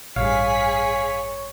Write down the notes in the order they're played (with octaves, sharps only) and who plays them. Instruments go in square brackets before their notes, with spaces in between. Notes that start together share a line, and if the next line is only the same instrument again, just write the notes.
[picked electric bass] A1 G2 [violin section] G#4 B6 [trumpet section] C#5 [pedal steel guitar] F5